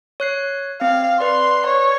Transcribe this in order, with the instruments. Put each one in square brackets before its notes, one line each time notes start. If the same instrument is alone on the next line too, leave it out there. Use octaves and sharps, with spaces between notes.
[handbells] C#5 F#6 C7
[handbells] C4 [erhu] F5
[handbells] B4 D5 [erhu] C6
[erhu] C#5